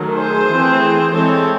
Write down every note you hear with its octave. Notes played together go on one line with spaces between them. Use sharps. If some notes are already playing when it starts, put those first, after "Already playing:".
Already playing: D#3 F#3 A3
G#4 C5
E3 A3 C4
E3 G#3 C4 A4 C#5